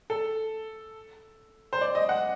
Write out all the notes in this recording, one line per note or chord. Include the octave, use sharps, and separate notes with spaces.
A4
C5
D5
D#5
F#5